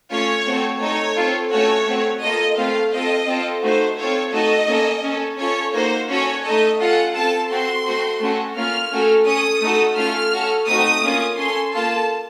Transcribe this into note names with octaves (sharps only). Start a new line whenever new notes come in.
A3 C#4 F4 C#5
A3 C4 F#4 A4
A3 D#4 A4 C#5
C4 F4 A4
A3 C#4 F#4 A4 C#5
A3 C4 F#4
A#3 F4 A4 D#5
A3 C4 F4 F5
C4 F4 A4 D#5
C4 F4 A4
A3 D#4 F#4 C5
C4 F4 A4 C#5
A3 D#4 F#4 A4 D#5
A#3 C#4 A4
C#4 A4
C#4 F4 A4 C#5
A#3 D#4 F#4 C5
C#4 F#4 A4 C#5
A3 D#4 A4 D#5
C#4 F4 A4 F#5
C4 F4 A4 A5
C4 F#4 A4 C6
A3 C4 F#4
A3 C#4 F#4 A4
A#3 C#4 F4 F6
A3 C#4 F#4 A4
C#4 A4 D#6
A3 D#4 F#4 A4
A3 C#4 F4 A4 F6
C#4 F#4 A4
A3 C4 D#4 F#4 D#6
A#3 C#4 F4
C#4 A4 C6
A#3 F4 A4 A5